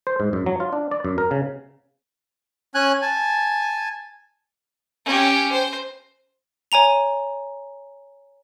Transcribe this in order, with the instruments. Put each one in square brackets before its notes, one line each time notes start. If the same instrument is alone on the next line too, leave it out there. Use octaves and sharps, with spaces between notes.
[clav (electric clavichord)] C5
G#2
F#2
F#3
F4
D4
D5
F#2
A#4
C#3
[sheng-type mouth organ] C#4 G#5 F#6
G#5 A5
[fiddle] C#4 G4
C5
[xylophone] C#5 G#5 A#5 F7